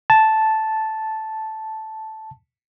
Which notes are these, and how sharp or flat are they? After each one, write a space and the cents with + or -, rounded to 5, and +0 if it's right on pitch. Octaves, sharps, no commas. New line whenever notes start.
A5 -5